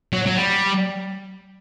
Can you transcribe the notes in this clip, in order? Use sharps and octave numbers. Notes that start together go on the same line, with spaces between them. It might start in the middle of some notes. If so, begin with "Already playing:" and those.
F#3
F#3
G3